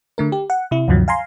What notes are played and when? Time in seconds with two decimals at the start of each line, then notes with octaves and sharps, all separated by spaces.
0.18 D3 A3 A#4
0.32 G4
0.50 F#5
0.71 C3 E4
0.88 D2 G2 C3 D#3 F3 F#3
1.08 F5 G#5 A#5 C6